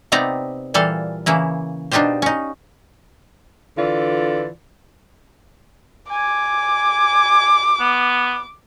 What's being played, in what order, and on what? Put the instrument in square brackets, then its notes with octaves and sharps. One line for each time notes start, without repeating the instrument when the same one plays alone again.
[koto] C3 B3 C4 D#4 D5 A#5
A#2 E3 G3 A4 F5
C#3 E3 A#3 E4
B2 D4 D#4 F4 G4 C5
C#4 D#4
[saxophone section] D3 E3 F4 D5
[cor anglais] G#5 [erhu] D6
[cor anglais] B3